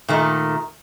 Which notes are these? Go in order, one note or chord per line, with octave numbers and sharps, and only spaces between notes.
A#2 D#3 A3